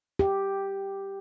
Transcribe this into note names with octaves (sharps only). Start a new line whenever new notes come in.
G4